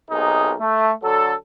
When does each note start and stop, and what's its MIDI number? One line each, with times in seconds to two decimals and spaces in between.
0.11 0.54 35
0.11 0.54 48
0.11 0.54 63
0.11 0.54 68
0.11 0.54 70
0.59 0.92 57
1.03 1.34 50
1.03 1.34 54
1.03 1.34 69